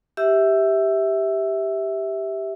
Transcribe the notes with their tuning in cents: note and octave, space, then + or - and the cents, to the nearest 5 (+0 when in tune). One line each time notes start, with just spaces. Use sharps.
G4 +0 E5 -15 E6 +10